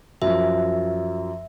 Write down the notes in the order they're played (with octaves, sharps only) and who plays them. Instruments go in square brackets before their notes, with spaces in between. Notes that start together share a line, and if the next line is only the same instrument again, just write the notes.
[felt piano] F#2 F3 [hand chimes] E5